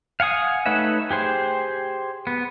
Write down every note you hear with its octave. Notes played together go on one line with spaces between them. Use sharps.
F5 F#5 G#5 D#6
A3 D#4 B4 C#5 E5
G4 G#4 C5
B3